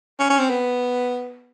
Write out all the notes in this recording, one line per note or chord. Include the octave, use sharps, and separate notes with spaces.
C#4
C#4
C4
B3